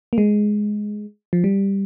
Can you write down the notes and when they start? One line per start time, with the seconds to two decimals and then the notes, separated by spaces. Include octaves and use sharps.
0.13 A#3
0.18 G#3
1.33 F3
1.44 G3